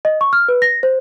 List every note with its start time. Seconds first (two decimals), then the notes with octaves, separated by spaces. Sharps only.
0.05 D#5
0.21 C#6
0.33 F6
0.48 B4
0.62 A#6
0.83 C5